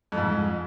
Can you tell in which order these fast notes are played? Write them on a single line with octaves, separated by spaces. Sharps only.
F2 F3 G#2